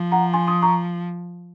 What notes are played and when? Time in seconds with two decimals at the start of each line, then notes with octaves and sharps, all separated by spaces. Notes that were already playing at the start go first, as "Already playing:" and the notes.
Already playing: F3
0.12 F#5 A#5
0.34 G#5 C6
0.47 C6 D#6
0.62 A#5 C#6